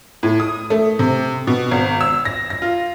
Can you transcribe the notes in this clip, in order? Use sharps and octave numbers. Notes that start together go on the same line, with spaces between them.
A2
D#6
A3
C3
B2
G#1
E6
A#6
A#6
F4